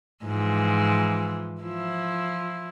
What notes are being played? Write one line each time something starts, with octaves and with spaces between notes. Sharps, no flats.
G#2 E3 F3
F3 E4